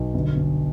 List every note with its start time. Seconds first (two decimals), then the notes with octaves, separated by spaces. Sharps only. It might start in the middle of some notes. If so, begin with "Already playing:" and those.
Already playing: B1
0.14 G1
0.37 G1